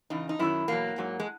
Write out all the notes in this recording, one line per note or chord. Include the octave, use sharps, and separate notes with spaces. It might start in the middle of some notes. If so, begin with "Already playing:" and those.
E2 C#3 D#4
D#4
F#2 D#3 F#3 E4
E2 B2 F#3 A#3
G#2 F#3
G#3